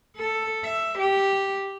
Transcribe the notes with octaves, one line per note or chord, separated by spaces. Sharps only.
A4
E5
G4